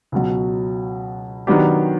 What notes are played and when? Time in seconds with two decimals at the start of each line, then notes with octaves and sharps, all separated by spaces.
0.12 C#2 B2 F#3
1.47 D#3 F#3 B3 D4 G4